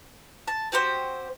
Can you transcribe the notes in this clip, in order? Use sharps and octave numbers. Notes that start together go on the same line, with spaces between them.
A5
C4 F#4 G4 C5